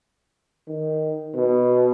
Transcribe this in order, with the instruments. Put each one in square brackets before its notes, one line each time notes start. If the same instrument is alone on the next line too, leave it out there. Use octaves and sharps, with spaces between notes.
[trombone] D#3
B2